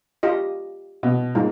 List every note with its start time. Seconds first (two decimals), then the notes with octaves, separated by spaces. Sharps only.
0.23 F4 G4 D#5
1.03 B2
1.35 G#2 A#3 F4